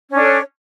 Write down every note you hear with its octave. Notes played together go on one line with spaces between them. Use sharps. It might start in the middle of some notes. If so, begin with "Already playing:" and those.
C#4 D4 A4 C#5